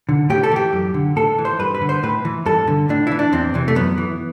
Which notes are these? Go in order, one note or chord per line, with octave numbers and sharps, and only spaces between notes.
D3
A2 G4
A4
E3 G4
F#2
D3
A2 A4
E3
C5
G2 B4
B4
D3
C5
A2 B4
E3
G2 A4
D3
A2 D4
E3 E4
D4
E2 C4
C3 E3
A3
F#2 B3
E3